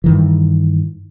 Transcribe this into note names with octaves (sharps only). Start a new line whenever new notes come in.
G2 D#3 E3